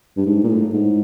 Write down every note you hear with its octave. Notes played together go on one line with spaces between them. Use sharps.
G2
G#2
A#2
A2
G#2